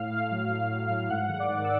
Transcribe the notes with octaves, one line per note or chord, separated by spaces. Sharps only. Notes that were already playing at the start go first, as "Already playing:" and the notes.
Already playing: A2 F5 F6
A2
F#3
A2
F#3
A2
G#2 F#5 F#6
D#3
D5 D6
G#2
E6